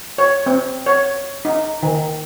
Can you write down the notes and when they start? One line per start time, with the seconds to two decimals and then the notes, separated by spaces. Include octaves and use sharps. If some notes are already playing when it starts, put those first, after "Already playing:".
0.18 C#5
0.46 C4
0.86 C#5
1.45 D#4
1.83 D#3